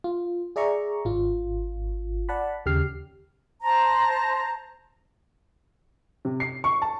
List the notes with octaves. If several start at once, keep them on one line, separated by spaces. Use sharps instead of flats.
F4
G#4 D5 E5 A#5 C#6
G#1 F4
D5 F#5 A5 B5
D#2 C#3 G4 F6 C7
C5 A5 A#5
C3
C7
C#6
A5